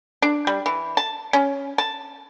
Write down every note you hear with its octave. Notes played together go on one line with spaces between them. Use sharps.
D4
G3
E3
A5
C#4
A5